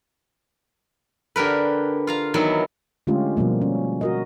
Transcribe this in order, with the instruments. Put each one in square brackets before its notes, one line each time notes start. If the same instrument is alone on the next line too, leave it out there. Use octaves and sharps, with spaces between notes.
[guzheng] D3 G4 A#4 B4
F4 F5 A#5
D#3 E3 F#3 B3 E4
[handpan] D3 G#3 A3 C#4 F4 G4
B2 F3 G3 A#3
C#4
F#4 A#4 D#5